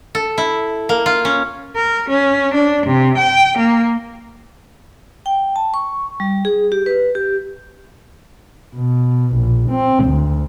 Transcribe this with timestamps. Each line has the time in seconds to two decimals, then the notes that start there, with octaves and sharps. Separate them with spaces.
0.15 A4
0.38 E4
0.89 A#3
1.06 F4
1.25 C#4
1.76 A#4
2.09 C#4
2.54 D4
2.86 C3
3.17 G5
3.58 A#3
5.26 G5
5.56 A5
5.74 C#6
6.20 G3
6.45 G#4
6.72 G4
6.86 B4
7.15 G4
8.75 B2
9.35 A#1
9.70 C4
10.05 D2